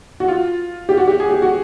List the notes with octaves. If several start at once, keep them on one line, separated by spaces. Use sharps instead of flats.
F#4
F4
G4
F#4
G4
G#4
G4
F#4